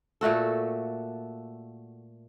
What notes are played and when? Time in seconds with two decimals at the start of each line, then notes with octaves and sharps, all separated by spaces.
0.21 A#2 A3 F#4 A4